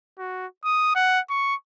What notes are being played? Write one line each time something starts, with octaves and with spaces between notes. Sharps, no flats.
F#4
D#6
F#5
C#6